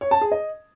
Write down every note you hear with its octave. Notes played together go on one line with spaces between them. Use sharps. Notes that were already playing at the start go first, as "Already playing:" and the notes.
C#5
A5
G#4
D#5